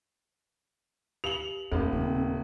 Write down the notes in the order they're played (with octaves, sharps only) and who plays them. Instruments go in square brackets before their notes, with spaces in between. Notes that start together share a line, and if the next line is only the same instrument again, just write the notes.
[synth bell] G4 F5 [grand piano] F7 F#7
[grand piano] D#1 [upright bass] F2 [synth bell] A3 D#4 A4
[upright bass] C#3 [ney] C4